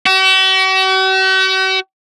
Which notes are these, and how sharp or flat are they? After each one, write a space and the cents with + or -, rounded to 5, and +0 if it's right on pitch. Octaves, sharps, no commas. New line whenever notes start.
F#4 +45